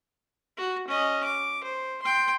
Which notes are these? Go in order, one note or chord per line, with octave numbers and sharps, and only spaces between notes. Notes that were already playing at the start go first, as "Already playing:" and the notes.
F#4
C#4 D#5
D6
C5
G5 C6